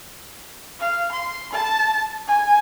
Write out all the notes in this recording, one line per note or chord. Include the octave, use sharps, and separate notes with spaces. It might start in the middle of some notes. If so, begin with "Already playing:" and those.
F5
C6
A5
G#5